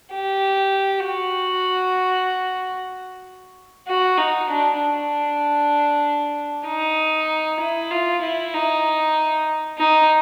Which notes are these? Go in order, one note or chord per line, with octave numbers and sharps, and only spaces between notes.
G4
F#4
F#4
D#4
D4
D4
D#4
E4
F4
E4
D#4
D#4